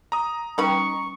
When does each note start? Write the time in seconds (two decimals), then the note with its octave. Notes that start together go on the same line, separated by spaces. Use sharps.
0.12 A#5 D#6
0.58 G3 C#4 D#4 B4 G5 C#6